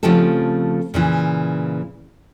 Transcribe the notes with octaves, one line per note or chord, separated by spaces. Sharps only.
C#3 F3 A3 C4 G4 A4
A#2 C#3 E3